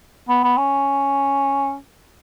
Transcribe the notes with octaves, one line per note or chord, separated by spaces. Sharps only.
B3
B3
C#4